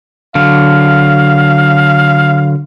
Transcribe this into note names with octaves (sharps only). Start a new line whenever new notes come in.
D3 F#3 F5